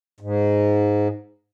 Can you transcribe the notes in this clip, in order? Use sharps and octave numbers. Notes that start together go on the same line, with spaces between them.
G#2